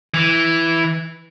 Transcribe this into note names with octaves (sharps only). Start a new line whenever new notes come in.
E3